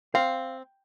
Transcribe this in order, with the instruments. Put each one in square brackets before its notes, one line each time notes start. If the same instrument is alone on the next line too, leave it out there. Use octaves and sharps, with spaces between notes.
[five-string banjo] C4 [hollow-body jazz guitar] F5